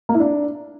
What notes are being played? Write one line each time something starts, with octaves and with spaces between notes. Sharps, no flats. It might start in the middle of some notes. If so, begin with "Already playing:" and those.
A#3
E4
D4